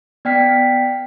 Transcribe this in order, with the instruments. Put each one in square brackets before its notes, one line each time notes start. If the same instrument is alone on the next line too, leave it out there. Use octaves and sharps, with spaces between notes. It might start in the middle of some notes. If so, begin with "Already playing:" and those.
[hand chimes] B3 D5 G5 F6 B6 C7